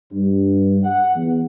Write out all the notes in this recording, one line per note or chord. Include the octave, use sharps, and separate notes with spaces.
G2
F#5
E2